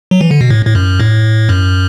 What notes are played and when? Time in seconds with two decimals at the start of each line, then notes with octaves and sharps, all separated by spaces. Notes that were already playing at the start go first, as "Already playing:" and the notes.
0.11 F#3
0.21 E3
0.31 D3
0.41 B2
0.50 A2
0.66 A2
0.75 F#2
1.00 A2
1.49 F#2